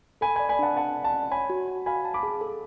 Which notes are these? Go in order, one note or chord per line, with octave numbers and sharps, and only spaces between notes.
A4 G#5 B5
D5 G#5 B5
G#5 B5
D4 F#5 A5
A4 F#5 A5
D5
F#5 A5
C#4
C#5 G#5 B5
F#4
F#4
F5 G#5 B5
A5
B5 D6
G#4
A4